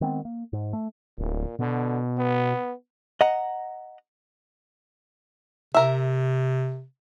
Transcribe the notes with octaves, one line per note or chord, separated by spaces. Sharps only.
D#3 G#3 B3 C4
A#3
G#2
A3
D1 A#2
B2 D3
B3
D#5 F#5 A#5
C3 A#4 E5